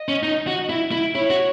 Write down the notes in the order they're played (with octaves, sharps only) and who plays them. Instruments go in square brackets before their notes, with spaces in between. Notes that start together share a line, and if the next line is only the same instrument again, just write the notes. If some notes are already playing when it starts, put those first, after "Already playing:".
Already playing: [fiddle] D#5
[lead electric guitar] C#4
D#4
F#4
E4
E4
[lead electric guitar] E4 [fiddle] C#5
[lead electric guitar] F#4